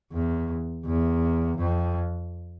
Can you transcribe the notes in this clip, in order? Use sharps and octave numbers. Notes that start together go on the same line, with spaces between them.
E2
E2
F2